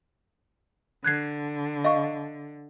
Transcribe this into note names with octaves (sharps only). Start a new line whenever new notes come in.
D3 F#6 G#6 C7
D#5 F5 C#6